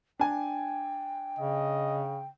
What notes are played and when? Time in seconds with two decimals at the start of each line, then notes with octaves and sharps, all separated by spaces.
0.19 D4 G5 G#5
1.39 C#3 D#5